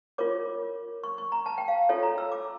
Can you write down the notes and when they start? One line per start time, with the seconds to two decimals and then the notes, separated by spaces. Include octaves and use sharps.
0.18 F4 A#4 C#5 D6
1.04 C#6
1.18 C#6
1.32 A#5
1.46 A5
1.58 G5
1.68 F5
1.89 F4 A4 C#5 E5
2.03 A#5
2.18 E6
2.32 D6